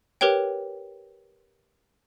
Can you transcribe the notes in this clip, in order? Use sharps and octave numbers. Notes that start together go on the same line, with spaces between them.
G4 A#4 B4 C#5 G5